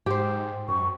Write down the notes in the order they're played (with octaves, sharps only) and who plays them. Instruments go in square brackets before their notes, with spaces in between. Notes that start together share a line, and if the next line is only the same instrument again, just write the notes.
[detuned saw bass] G#2 [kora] G4 C5
[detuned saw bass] F#2 [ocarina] C#6